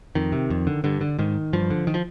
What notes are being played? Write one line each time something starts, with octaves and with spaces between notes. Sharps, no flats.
F2 D#3
C3
F2
D3
G2 D3
D3
G#2 D#3
G2 F3
D3
D#3
F3